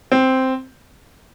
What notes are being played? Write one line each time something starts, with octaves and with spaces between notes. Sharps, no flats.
C4